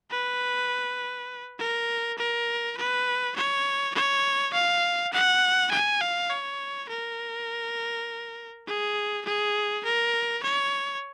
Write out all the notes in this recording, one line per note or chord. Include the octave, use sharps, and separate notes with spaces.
B4
A#4
A#4
B4
C#5
C#5
F5
F#5
G#5
F5
C#5
A#4
G#4
G#4
A#4
C#5